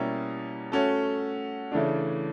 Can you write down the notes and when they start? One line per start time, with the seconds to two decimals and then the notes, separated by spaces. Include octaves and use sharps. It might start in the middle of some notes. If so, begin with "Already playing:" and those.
Already playing: B2 G3 A#3 C#4 E4
0.72 A3 C#4 F#4 A4
1.72 C#3 E3 A3 D4